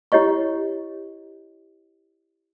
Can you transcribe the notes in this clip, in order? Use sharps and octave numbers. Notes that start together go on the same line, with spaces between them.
E4 G4 C#5 D#5 C#6